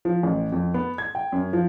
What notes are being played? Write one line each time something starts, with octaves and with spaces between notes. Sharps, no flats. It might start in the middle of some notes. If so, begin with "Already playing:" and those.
F3
A1
F2
B3
G#6
G5
F#2
F3